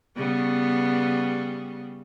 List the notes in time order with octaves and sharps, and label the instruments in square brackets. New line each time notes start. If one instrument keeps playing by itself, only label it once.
[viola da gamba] C#3 G3 B3